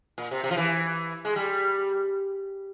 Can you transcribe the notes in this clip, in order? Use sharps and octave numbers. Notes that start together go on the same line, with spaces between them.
A#2
C3
C3
F3
E3
G#3
G3